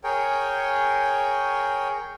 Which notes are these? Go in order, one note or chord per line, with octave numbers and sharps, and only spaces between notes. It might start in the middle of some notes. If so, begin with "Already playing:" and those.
G#4 A#4 C#5 G5